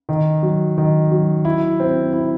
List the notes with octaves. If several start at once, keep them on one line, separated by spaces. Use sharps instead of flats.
D#3
F#3
D#3
F#3
E4
C4
E4